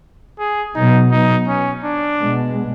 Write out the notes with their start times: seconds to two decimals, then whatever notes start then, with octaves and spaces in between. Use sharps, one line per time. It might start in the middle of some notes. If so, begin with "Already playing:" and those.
0.39 G#4
0.75 B2 F#3 B3 D#4
1.11 D#4
1.48 C#4
1.84 D4
2.20 B2 G#3 B3